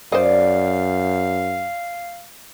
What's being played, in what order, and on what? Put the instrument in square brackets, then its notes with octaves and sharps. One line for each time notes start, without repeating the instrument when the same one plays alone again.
[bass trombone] F#2 [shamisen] C5 D#5 [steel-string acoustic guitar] D5 [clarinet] F5